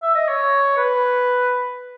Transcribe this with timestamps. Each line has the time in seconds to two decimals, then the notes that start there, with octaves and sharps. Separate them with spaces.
0.03 E5
0.15 D#5
0.28 C#5
0.77 B4